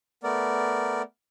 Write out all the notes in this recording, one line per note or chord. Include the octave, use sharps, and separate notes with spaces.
A3 B3 A#4 D5